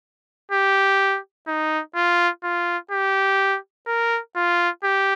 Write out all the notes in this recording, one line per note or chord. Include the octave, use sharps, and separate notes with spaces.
G4
D#4
F4
F4
G4
A#4
F4
G4